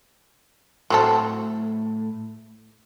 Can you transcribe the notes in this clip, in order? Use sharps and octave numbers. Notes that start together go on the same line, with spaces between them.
A2 F#3 A3 C4 A4